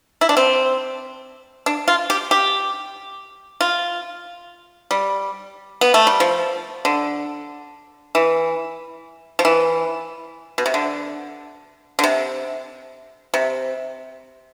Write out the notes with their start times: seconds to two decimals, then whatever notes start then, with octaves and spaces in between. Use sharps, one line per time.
0.21 E4
0.29 D4
0.37 C4
1.66 D4
1.88 F4
2.10 G4
2.31 G4
3.61 F4
4.91 G3
5.81 B3
5.94 A3
6.07 G3
6.20 F3
6.85 D3
8.15 E3
9.39 F3
9.45 E3
10.58 B2
10.66 C3
10.74 D3
11.99 D3
12.04 C3
13.34 C3